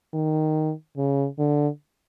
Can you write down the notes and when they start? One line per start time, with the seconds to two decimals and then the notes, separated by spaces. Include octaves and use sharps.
0.14 D#3
0.97 C#3
1.38 D3